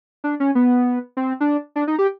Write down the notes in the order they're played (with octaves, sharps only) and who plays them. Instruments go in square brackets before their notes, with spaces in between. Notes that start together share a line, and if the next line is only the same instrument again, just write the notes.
[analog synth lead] D4
C#4
B3
C4
D4
D4
D#4
G4